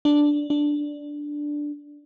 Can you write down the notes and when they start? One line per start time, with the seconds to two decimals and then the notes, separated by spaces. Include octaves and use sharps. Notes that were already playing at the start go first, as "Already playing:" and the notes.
0.05 D4
0.50 D4